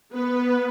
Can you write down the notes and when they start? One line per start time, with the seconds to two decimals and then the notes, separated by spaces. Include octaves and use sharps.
0.12 B3 B4